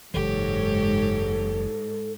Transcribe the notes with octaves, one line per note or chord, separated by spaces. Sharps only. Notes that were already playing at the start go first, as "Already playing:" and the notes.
F#1 G#2 E3 G4 A4 C#5